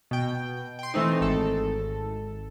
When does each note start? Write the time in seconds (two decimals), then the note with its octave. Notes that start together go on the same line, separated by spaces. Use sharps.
0.11 B2 G5
0.79 G5 C6
0.94 E3 A3 C4 D#4
1.20 G#1 A4